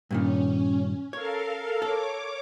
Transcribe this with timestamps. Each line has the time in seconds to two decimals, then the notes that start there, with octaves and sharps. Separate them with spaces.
0.11 G2 A#2 D#3 C#4
1.13 A4 A#4 C#5 F5
1.82 A4 C#5 D6